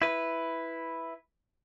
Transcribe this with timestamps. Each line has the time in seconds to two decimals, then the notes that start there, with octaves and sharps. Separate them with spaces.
0.02 E4 B4